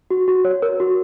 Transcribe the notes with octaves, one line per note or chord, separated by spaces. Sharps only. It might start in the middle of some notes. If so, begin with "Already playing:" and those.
F#4
F#4
C#5
A#4
F#4